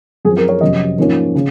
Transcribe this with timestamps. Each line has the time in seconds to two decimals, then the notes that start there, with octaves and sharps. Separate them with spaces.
0.25 F#2 F3 C4 G#4
0.37 A#4
0.49 C#5
0.61 F2 C3 F#3 C#4 D#5
0.98 G#2 F3 A#3 C#4
1.35 C#3